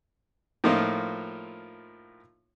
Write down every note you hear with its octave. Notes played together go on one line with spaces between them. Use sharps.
A2 F3 A#3 D#4 F4